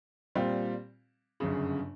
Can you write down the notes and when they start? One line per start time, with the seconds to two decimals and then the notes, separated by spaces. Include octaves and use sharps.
0.35 A#2 G3 C4 F4
1.40 G1 F#2 C#3